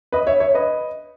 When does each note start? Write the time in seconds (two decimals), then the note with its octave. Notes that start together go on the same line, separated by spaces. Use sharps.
0.12 B4 D#5
0.27 C#5 E5
0.40 C#5 E5
0.54 B4 D#5